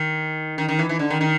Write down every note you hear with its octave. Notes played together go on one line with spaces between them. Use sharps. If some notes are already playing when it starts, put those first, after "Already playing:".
Already playing: D#3
D#3
D#3
E3
E3
D3
D#3
D#3